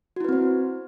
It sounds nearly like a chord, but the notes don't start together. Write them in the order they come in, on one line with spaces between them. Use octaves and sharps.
F#4 E4 B4 C4 C5